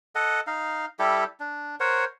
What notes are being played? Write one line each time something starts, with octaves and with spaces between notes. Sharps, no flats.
A4 D#5 F#5
D#4 F5
G3 E4 G4 A4
D4
A#4 C5 C#5 F#5